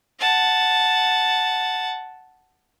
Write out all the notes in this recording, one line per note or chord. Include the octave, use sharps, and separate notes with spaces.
F#5 A5